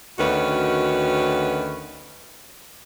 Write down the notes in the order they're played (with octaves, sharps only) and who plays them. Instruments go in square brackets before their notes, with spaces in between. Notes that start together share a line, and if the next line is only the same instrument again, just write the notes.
[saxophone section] D2 D#3 C#4 F#4 B4